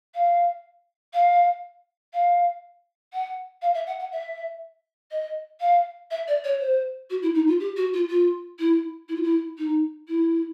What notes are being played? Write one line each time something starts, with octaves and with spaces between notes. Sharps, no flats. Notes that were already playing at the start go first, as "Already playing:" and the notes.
F5
F5
F5
F#5
F5
E5
F#5
F#5
E5
D#5
F5
E5
D5
C#5
C5
F#4
E4
D#4
F4
G4
F#4
F4
F4
E4
E4
F4
E4
D#4
E4